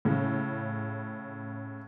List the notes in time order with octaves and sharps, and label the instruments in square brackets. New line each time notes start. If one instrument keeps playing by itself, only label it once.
[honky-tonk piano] A2 C#3